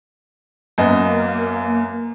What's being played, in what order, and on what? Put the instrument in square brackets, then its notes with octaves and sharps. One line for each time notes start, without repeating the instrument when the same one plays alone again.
[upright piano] F#2 B3 D#5 [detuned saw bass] A#3